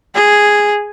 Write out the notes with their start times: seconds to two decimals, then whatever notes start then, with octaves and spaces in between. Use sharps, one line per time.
0.15 G#4